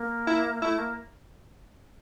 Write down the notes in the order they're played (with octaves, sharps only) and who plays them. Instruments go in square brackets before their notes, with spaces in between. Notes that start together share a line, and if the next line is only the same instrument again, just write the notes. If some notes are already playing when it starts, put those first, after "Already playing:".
Already playing: [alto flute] A#3
[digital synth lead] E4
[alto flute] A3 [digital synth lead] E4
[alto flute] A#3